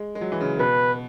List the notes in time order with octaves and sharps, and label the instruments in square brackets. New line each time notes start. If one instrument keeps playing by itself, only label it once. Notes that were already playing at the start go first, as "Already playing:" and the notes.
Already playing: [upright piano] G#3
G#3
F#3
E3
C#3
[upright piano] B2 [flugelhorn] B4